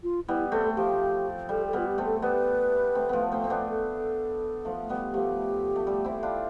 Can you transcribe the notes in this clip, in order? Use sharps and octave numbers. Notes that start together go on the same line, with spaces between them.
F4
G3 B3 E4
A3 C4 A4
F3 G4
G3 A4
A4
G3 B3 F4
G4
A3 C4
A4
G3 B3 B4
A3 C4
F3 A3 B3
A3 C4
C4
B3 D4
A4
F3 A3
G3 B3
F3 A3 G4
A3
G3
C4 E4
D4 F4